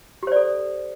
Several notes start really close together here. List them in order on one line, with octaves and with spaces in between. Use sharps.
G4 C5 D5 A4